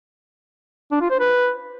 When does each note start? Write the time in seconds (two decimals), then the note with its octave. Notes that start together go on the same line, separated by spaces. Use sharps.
0.92 D4
1.01 F4
1.11 C5
1.20 B4